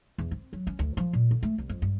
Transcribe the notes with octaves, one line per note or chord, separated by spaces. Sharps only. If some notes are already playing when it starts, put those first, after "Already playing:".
E2
C4
F#3
C#4
D2
F3
A#2
D3
A3
C2
F2
G2